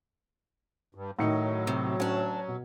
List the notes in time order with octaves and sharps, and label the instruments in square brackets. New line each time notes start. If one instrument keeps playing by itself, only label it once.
[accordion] G2
[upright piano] A2 C#7 [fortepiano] D#3 D#4 [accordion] F#3
[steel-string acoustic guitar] C3
[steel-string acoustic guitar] D2 D4 [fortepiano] C#4
[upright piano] B2